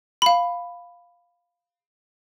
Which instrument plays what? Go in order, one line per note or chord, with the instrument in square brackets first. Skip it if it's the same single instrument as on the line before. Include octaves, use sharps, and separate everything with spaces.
[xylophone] F5 B5